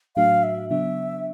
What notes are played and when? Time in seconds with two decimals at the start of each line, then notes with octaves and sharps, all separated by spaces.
0.16 A2 F#3 A3 D4 F#4 F5
0.43 E5
0.70 C#3 F#3 B3 D4 E5